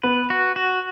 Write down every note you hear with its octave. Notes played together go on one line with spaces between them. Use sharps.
B3 B4
F#4
F#4